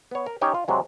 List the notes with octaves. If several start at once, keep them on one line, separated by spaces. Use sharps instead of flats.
B3 C#5
A#4
C#4 D#4 G4 C#5
F4
C3 F#3 G#3